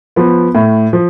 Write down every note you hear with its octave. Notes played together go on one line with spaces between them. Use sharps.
F3 B3
A2
F3